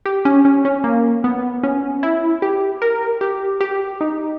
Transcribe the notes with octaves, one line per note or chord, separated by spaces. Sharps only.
G4
C#4
C#4
C#4
A#3
B3
C#4
E4
G4
A#4
G4
G4
D#4